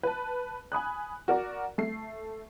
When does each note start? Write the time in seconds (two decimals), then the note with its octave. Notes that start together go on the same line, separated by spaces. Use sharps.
0.03 B4 A5
0.72 G#5 B5 D#6 F#6
1.28 F#4 A#4 D5
1.78 A3 C7